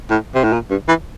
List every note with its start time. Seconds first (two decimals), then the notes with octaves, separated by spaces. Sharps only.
0.10 A2
0.35 C3
0.44 A2
0.53 A#2
0.70 G2
0.88 E3